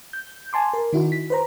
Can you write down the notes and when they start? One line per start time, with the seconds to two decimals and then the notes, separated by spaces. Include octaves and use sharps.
0.13 G6
0.53 G#5 A5 C6 D6
0.73 A#4
0.93 D#3 D#4 E4 F#4
1.12 B6
1.30 B4 C5 A#5